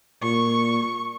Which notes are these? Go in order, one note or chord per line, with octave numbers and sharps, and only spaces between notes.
A#2 C#6